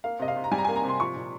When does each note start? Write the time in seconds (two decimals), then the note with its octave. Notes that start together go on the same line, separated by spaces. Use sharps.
0.04 A#3 F5
0.19 C3 D#5
0.28 F5
0.36 C3
0.44 A#5
0.51 G3 G#5
0.58 A#5
0.65 A#3 G#5
0.76 A#5
0.84 C3 C6
1.00 F3 C#6
1.15 A#2